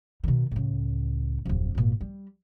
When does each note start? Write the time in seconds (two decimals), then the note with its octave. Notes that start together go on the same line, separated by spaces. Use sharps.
0.24 B2 D#3
0.51 C#2 A2
1.45 D1 F2
1.75 G#1 A#2
2.01 G3